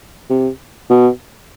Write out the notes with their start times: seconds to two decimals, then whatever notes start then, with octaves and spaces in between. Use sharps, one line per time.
0.30 C3
0.90 B2